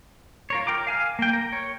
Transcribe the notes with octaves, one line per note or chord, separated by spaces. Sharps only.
F4 A#4 C#5
A#4 G5 A#5 D6
F5 G#5 F6
A#3 G5
A#4
C#5